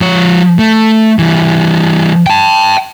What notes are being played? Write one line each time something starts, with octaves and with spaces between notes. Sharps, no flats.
F3 C#5
A3
E3 G3
G5 A5